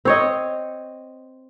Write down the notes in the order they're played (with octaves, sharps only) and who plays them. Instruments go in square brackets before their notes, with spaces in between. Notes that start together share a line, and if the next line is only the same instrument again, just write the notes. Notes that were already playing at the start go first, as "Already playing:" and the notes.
[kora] C4 C#5 D#5